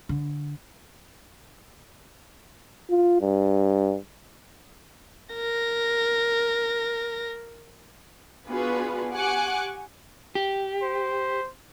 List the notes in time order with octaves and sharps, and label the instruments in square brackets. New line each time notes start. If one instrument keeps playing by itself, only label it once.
[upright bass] D3
[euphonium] F4
G2
[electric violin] A#4 A#6
[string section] B3 D4 F4 F#4 G#4 B4
G4 F#5 G#5 C#6 D6 F#6
[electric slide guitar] G4
[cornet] C5